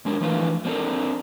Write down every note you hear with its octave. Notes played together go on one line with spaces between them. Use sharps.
G#2 G#3 D4 A#4
E3 F3 A3 D4 B4 F5
A#3 C4 D4 A4 A#4